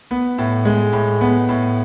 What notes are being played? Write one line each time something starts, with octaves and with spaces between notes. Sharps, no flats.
B3
A2
G#3
A2
B3
A2